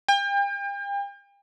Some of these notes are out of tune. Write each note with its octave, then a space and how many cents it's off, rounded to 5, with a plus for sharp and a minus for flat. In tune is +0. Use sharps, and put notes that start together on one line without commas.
G5 +40